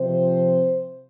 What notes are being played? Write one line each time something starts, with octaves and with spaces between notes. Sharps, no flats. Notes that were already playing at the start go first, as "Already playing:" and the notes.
Already playing: C3 F3 C4 C5